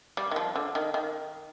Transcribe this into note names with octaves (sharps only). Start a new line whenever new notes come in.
G3
D#3
F3
D3
D#3
D#3